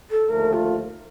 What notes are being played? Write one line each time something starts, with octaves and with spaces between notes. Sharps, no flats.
A4
D#2 D3 F3 A3 A#4
F4